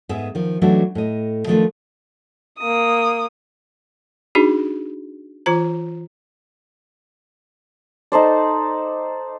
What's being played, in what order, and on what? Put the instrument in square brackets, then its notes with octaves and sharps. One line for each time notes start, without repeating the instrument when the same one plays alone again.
[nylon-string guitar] G#2 B3 G#4 E5
D#3 F3
E3 F#3 A3 D4 D#4 F#4
A2 D#5
D#3 F3 A3 B3 D4 F4
[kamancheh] A#3 D#6
[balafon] D4 D#4 F#4 G#4
E3 F4 C5 A#5
[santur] D#4 A4 C5 D5